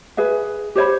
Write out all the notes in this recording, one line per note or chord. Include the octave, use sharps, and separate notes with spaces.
G#4 B4 E5
G4 C5 C#5 B5